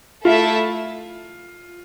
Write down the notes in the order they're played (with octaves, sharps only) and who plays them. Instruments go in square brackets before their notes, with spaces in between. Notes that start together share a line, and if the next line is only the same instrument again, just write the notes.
[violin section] A3 E4 A4 E5 A5 [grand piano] F4